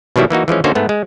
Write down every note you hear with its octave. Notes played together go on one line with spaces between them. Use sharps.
B2 D#3 F#3 G3 E4
E3 A#3 D#4 F#4
E3 F3 G#3 C#4
D3 A#3 C#4 D#4 F#4 C5
G#2 A3 B3
G#3